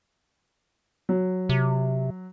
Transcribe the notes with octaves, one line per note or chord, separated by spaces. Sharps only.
F#3
C3